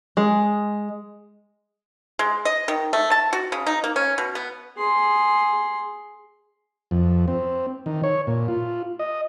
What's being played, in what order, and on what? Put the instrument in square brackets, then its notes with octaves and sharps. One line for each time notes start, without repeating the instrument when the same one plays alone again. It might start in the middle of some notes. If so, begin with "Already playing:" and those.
[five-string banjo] G#3
[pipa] G#3
D#5
D#3
A3
A5
F#4
C#3
D#4
A#3
C#4
B2
B3
[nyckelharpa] G#4 C6
[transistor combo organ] F2
C4
D#3
C#5
A#2
F4
D#5